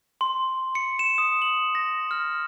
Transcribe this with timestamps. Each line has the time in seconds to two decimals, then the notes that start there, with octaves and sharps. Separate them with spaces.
0.21 C6
0.75 C#7
0.99 E7
1.18 D#6
1.42 F#7
1.75 A#6
2.11 F6